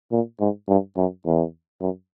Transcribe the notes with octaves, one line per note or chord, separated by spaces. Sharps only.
A#2
G#2
G2
F#2
E2
F#2